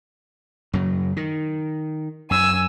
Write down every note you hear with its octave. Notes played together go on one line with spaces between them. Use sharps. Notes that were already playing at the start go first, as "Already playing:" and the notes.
F#2 C#3 F#3
D#3
F#2 G#5 E6